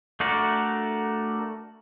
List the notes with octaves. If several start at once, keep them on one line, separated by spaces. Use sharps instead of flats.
A3 D4 F#4 A#4 D5